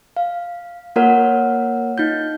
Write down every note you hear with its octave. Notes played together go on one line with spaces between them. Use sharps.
F5
A#3 F4 A#4 C#5 F#5 F6
D#4 F4 G6